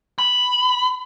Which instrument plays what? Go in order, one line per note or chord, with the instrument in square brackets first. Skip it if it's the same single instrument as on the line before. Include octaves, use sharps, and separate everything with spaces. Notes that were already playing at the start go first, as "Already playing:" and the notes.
[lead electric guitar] B5